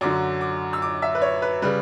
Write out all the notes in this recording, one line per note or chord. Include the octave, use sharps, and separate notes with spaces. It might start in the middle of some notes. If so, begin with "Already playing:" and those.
F#2 D3 F#3 D6
D6
E6
D6
E5
B4
C#5
B4
C#3 G3 B4